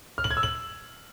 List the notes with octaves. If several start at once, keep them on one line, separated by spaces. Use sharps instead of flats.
F6
F#7
G#6
E6
F#7